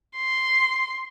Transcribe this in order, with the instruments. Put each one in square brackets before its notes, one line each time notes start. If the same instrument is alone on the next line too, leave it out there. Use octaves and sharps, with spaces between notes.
[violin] C6